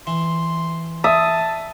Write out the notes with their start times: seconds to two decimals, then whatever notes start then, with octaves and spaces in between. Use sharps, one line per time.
0.07 E3 C6
1.04 E5 A5 D#6